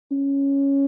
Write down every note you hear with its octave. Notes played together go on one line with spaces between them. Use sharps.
C#4